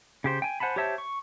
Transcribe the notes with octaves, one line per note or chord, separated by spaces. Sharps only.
C#3 G4 C5
G5 G#5
C5 F#5 G#5 A5 B5
G4 C5 C#5 E5 A5
C#6